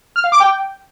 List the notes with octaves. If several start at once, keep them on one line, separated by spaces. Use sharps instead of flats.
F6
F5
D6
G5